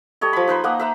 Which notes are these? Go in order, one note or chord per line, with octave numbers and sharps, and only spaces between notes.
G3 A4 C#5 D#5
F3 B5
D#4 B4 C5 B5
A#3 D#5 F#5 D#6
B4 E5 A#5